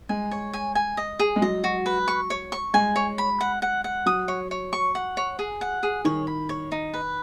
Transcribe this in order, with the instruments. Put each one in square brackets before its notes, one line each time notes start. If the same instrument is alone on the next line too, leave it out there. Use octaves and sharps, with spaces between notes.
[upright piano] G#3 [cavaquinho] G#5
[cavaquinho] C#5
G#5
G#5
D#5
G#4
[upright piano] G#3
[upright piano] F#3 [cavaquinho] D#5
[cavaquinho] F#4
B4
C#6
C#5
C#6
[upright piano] G#3 [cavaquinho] G#5
[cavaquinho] C#5
B5
F#5
F#5
F#5
[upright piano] F#3 [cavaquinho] D#6
[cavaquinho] C#5
C#5
C#6
F#5
C#5
G#4
F#5
G#4
[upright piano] D#3 [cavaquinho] C#5
[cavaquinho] B5
C#5
D#4
B4